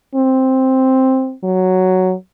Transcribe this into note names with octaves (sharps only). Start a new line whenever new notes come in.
C4
F#3